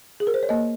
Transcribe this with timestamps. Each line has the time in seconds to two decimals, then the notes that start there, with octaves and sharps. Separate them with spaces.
0.20 G#4
0.27 A#4
0.34 C5
0.43 C#5
0.49 A#3 D#5